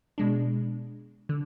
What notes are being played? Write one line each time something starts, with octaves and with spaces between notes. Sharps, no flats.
B2 G#3 D4
D3